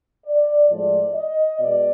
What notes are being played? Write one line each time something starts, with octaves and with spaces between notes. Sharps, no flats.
D5
A2 F3 G#3 D5
D#5
B2 G#3 D5